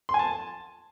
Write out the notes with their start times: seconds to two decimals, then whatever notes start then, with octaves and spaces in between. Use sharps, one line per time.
0.09 C6
0.14 G#5
0.19 A5